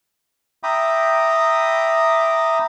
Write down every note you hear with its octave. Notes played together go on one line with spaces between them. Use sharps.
E5 G5 A#5 B5 D6 D#6